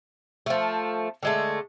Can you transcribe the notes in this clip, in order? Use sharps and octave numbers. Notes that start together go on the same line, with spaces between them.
F3 A3
D3 G#3 A3